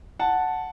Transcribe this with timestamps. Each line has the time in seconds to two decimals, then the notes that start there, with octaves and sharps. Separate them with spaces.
0.19 F#5 A5